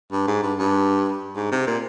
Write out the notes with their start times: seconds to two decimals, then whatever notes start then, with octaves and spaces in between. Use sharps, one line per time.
0.12 G2
0.27 G#2
0.43 G2
0.59 G2
1.36 G#2
1.52 C3
1.67 A#2